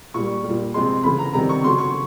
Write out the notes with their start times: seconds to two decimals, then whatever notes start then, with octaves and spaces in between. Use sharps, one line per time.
0.14 A#2 G3 C#6
0.44 G3
0.49 A#2
0.74 C3 F3 G#3 C6
1.03 C#3 E3 A3 B5
1.18 A#5
1.33 C3 D#3 G3 A#5
1.49 C#6
1.64 C#3 F#3 A3 C6
1.78 C#6